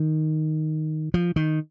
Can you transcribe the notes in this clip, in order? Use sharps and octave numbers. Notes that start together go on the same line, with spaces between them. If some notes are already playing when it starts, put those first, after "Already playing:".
Already playing: D#3
F3
D#3